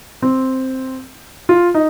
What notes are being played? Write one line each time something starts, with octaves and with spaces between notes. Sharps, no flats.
C4
F4
D#4